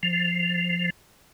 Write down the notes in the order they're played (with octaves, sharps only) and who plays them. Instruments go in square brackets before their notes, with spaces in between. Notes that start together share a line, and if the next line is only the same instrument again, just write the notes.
[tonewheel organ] F3